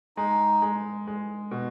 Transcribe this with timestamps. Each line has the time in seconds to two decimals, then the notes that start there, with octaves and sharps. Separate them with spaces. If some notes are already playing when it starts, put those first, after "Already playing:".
0.17 G#3 D#4
0.62 G#3
1.07 G#3
1.51 B2